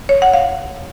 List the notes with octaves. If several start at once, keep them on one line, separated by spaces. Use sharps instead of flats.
C#5
F#5
F5